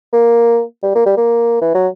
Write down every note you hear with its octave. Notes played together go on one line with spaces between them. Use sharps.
A#3
G3
A#3
G3
A#3
E3
F#3